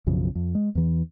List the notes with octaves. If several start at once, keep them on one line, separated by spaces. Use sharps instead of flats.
B1 F#2 C#3 F3
F2
G#3
E2 E3